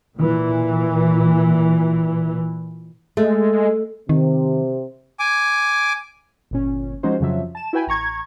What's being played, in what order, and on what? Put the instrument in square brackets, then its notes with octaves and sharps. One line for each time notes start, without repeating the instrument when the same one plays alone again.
[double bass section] A#2 E3
[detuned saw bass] G#3 [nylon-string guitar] A3
[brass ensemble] C3 [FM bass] D#3
[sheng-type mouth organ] G#5 D6
[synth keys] G1 A#2 C#4
F3 G#3 C#4 D#4 F#4 C5
F2 C#3 F3 F#3 E5
A5 E7
E4 F#4 B4 G5 G#5 B5
A1 A#5 C#6 G#6